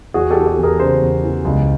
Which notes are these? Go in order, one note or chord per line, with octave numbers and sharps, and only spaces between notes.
E2 F#4 G#4
G4 A4
E3
G4 A4
E2
G#4 A#4
C#3 A#4 C5
E2
E3
C#2